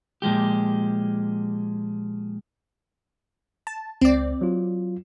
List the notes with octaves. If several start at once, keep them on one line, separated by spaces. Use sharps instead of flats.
A#2 F3 G#3 G4
A5
C#2 C4 D5
F#3 F4